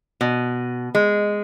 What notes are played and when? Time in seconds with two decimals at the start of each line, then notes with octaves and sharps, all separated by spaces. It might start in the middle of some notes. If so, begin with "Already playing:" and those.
0.21 B2
0.95 G#3